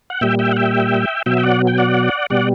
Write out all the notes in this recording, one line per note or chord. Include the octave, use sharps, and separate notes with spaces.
F#5
A#2 G3 E5 G5
E5 G5
F#5
E5 G5
B2 F#3 E5 G5
G5
D5 F#5
G5
D5 F#5
B2 G3 D5 F#5